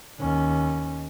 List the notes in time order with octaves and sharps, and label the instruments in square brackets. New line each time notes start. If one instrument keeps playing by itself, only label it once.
[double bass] D#2 C#4